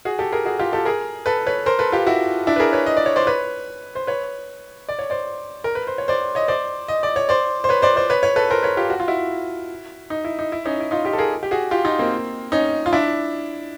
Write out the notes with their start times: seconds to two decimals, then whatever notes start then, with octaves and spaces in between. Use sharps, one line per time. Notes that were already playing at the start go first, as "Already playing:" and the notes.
0.05 F#4 G#4
0.19 G4 A4
0.32 G#4 A#4
0.46 F#4 G#4
0.59 F4 G4
0.73 G4 A4
0.85 G#4 A#4
1.26 A4 B4
1.47 B4 C#5
1.66 A#4 C5
1.79 A4 B4
1.92 F4 G4
2.07 E4 F#4
2.47 D4 E4
2.56 B4
2.59 G#4 A#4
2.73 B4 C#5
2.86 D#5
2.97 D5
3.06 C#5
3.16 C5 D5
3.27 B4 C#5
3.95 C5
4.07 B4 C#5
4.89 D5
4.99 C#5
5.10 C5 D5
5.64 A#4
5.75 B4
5.87 C5
5.98 C#5
6.08 C5 D5
6.35 C#5 D#5
6.48 C5 D5
6.88 D#5
7.03 D5
7.16 C#5
7.29 C5 D5
7.64 C5
7.69 B4 C#5
7.82 C5 D5
7.96 C5 D5
8.10 B4 C#5
8.23 B4 C#5
8.36 A4 B4
8.50 A#4 C5
8.63 B4 C#5
8.77 F4 G4
8.90 F#4
9.00 F4
9.08 E4 F#4
10.10 D#4
10.25 E4
10.39 D#4
10.52 E4
10.65 C#4 D#4
10.80 E4
10.91 D#4 F4
11.04 F4 G4
11.13 A4
11.18 G#4 A#4
11.43 G4
11.51 F#4 G#4
11.71 F4 G4
11.85 D#4 F4
11.99 A#3 C4
12.52 C#4 D#4
12.86 F4
12.93 D4 E4